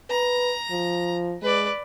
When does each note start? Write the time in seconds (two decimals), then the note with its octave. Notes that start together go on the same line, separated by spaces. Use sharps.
0.10 B4 A#5
0.70 F3
1.42 G#3 B4 D5